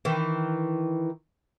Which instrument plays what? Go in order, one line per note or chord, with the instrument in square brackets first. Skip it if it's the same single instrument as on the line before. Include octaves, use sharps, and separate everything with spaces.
[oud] D#3 E3